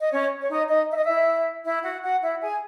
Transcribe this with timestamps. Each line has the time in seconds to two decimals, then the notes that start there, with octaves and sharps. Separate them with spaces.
0.01 D#5
0.12 C#4 C#5
0.40 C#5
0.50 D#4 D#5
0.69 D#4 D#5
0.89 E5
0.97 D#5
1.06 E4 E5
1.65 E4 E5
1.84 F#4 F#5
2.03 F#4 F#5
2.22 E4 E5
2.41 G#4 G#5